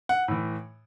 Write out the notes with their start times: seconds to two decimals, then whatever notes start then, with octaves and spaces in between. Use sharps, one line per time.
0.09 F#5
0.28 A2 E3